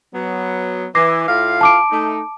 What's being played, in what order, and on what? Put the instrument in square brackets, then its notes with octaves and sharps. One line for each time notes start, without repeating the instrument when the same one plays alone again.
[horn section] F#3 B3
[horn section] E3 [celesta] D6 A#6 C7
[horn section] A2 F4 F5
[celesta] A5 D6 D7
[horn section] A3 D#4